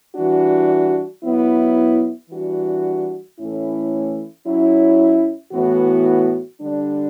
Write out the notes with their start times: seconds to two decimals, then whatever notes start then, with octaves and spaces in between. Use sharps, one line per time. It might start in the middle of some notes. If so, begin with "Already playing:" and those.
0.15 E3 G3 D4 F#4
1.23 F#3 B3 E4
2.30 E3 G3 D4 F#4
3.37 A2 E3 A3 C#4 E4
4.45 F#3 C#4 E4
5.52 A2 E3 B3 F#4
6.60 D3 G3 D4